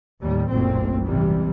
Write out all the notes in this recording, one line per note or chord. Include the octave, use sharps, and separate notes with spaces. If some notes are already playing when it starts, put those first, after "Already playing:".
D#2 A2 D#3 G3
F#1 B1 A#2 A3 C4
G#1 C3 E3 G3